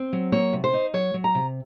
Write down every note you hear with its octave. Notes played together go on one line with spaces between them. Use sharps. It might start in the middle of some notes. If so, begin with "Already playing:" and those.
Already playing: C4
F#3
A#3 C#5
C3
C5
D#4
F#3 C#5
F#3
A#5
C3